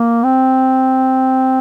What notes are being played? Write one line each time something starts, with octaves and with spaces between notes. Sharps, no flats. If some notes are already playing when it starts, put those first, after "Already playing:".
Already playing: A#3
C4